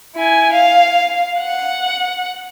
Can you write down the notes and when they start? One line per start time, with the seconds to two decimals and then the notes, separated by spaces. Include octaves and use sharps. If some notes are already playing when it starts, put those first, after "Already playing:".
0.16 E4 G#5
0.54 F5
1.39 F#5